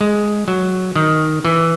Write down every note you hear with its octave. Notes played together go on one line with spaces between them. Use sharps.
G#3
F#3
D#3
E3